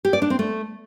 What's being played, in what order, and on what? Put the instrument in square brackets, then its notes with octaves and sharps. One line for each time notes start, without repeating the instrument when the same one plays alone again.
[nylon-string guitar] G4
D5
D4
C4
A3